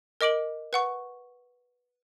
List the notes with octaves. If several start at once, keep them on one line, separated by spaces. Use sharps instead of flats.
A#4 D#5 D6 D7 F#7
B4 F#5 C#6